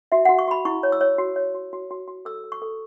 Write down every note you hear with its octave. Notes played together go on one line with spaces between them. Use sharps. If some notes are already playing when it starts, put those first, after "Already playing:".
F#4 E5
F#5
F#4
C#6
F#4 B5
E4 C#6
C#5
E6
C#5
F#4
C#5
F#4
F#4
F#4
F#4
A4 E6
A4
C#6
A4